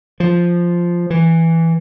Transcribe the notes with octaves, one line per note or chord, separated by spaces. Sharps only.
F3
E3